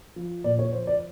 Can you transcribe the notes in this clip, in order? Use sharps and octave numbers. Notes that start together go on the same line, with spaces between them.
F3
A#2 D5
C#5
F3 C5
D5